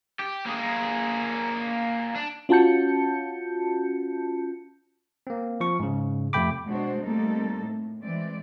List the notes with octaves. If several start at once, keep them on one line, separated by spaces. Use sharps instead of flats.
G4
A#3 G#4
D4
C#4 F4 F#4 A5 G6 C#7
A#3 C4
F3 C#6
G#2 C#3
F2 C3 A3 G5 B5 D6
B2 G#3 D4 F#4 C5
G3 A3 A#3 C4 D#4 A4
A2
E3 G#3 C4 D5